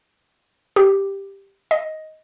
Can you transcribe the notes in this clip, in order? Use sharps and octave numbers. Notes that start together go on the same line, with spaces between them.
G4
D#5